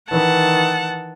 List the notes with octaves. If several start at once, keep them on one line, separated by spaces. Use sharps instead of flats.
D#3 E3 F#5 A5